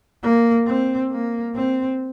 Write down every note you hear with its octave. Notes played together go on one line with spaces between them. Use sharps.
A#3
C4
A#3
C4